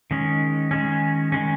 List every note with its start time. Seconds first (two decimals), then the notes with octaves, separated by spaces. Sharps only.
0.11 D#3 G#3 C#4
0.71 D#3 G#3 C#4
1.32 D#3 G#3 C#4